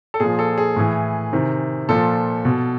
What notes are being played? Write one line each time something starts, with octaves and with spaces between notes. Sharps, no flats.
A4
A#2 F3 G#4
A4
G#4
A2 E3
C3 D#3
A#2 F3 A4
B2